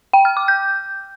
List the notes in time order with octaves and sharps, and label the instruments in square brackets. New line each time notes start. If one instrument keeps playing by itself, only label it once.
[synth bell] G5
F6
D6
G6